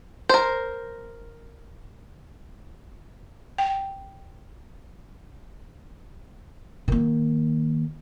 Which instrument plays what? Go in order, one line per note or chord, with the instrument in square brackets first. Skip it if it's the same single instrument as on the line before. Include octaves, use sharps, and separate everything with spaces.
[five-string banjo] A#4 C5
[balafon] G5
[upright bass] D#3 A#3